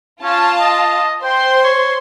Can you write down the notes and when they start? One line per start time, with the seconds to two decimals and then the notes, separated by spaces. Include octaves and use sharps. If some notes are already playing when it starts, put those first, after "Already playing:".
0.23 C#4 F4 F5 A5
0.60 D#5
1.23 C5 G5 C6
1.64 C#5